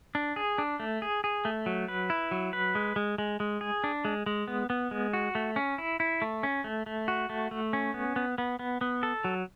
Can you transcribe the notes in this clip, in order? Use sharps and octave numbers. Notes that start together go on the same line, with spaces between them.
D4
G#4
D4
A3
G#4
G#4
A3
F#3
B4
E4
F#3
B4
G#3
G#3
G#3
G#3
G#4
D4
G#3
G#3
B3
B3
G#3
F#4
A3
C#4
E4
E4
A3
C#4
A3
A3
F#4
A3
A3
C#4
B3
B3
B3
B3
B3
A4
F#3